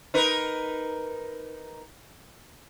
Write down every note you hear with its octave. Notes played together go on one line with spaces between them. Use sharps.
D#4 A#4 B4